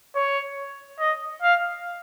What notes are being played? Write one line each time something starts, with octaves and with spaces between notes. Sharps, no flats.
C#5
D#5
F5